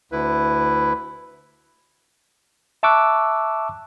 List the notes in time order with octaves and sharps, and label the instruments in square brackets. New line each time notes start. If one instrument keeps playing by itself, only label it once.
[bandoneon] D2 E4 B4
[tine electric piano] E5 A5 C#6 D6 E6 F#6